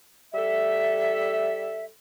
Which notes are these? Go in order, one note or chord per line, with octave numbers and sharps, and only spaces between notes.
G3 A4 E5